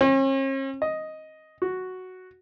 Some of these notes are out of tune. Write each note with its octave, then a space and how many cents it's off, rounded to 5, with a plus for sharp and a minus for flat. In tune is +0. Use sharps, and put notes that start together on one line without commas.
C#4 -45
D#5 +5
F#4 +0